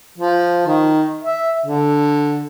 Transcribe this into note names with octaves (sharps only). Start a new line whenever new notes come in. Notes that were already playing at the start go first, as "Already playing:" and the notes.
F3
D#3
E5
D3